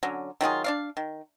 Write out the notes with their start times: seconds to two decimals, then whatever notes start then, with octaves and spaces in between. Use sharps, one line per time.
0.03 D3 F#3 C#4
0.41 D#3 F#3 F4 G#4
0.64 D4 D5 F5
0.97 D#3